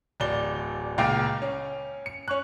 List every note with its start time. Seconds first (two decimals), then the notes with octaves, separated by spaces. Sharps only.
0.20 D1 A1 D5 G7
0.98 C#2 A#2 F5 G5 D6
1.42 C#4
2.06 C#7
2.28 C#4 C#6 F#6